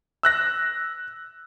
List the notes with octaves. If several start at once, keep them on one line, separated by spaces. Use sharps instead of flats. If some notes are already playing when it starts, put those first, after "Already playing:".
E6 F#6 A#6